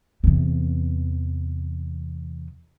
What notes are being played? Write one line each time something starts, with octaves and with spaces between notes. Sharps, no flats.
E2 C3